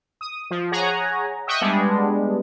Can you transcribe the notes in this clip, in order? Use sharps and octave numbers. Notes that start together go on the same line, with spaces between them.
D#6
F3
G#4 C#5 F#5 G#5 A#5
D#5 E5 G5 C#6 D#6 F#6
G3 G#3 B3 D4